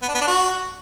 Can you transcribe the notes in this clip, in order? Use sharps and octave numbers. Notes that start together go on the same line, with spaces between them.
B3
D4
B3
D4
F#4